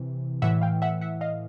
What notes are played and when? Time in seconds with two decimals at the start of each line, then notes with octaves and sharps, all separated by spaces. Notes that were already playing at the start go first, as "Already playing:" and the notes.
Already playing: C3 E3
0.42 A2 E3 E5 F#5
0.61 F5 G5
0.82 E5 F#5
1.01 E5 F#5
1.21 D#5 F5